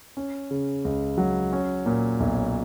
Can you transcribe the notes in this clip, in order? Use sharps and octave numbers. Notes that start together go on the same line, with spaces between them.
C#4
C#3
C#2
F#3
C#4
A#2
B1